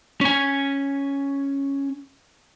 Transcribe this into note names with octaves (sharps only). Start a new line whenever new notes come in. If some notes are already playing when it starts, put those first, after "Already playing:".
C#4 G#5